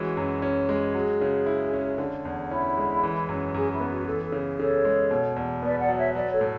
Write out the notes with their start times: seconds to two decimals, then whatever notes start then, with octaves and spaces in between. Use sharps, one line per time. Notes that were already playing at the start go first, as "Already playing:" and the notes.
Already playing: E3 G#3 C#4 F#4
0.17 F#2
0.42 C#4
0.69 G#3
0.94 F#3 G#4
1.21 C#3
1.46 E4
1.73 C#4
1.98 D3
2.25 E2
2.51 C#4 E4
2.77 G#3
3.03 E3
3.29 F#2
3.54 F#2 G#4
3.72 E4
3.80 B3
3.90 F#4
4.06 E3 A4
4.24 A4
4.32 C#3
4.59 C#3 A4 C#5
4.85 G#3
5.11 B2
5.36 E2
5.62 B3 B4 D5
5.80 D5 F#5
5.88 F#3
5.97 C#5 E5
6.14 F#3 B4 D5
6.32 A4 C#5
6.41 A2